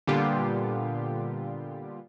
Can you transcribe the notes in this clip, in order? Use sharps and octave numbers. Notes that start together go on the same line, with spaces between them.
A#2 D3 G3 B3 F4 G4